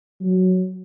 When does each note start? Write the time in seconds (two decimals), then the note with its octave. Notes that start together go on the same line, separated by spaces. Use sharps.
0.21 F#3